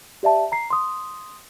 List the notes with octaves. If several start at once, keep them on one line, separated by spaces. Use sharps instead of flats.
G4 D5 E5 A5
A#5 C7
C6 D#6